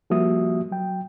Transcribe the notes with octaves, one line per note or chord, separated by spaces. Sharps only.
F3 G3 A#3 F#4 E5 D#6
F#3 G5